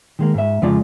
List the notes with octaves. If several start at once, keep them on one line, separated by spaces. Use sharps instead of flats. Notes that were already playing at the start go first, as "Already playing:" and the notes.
D#3 G#3 A#3
G#2 E5
F2 C#3 G#3 F4 D5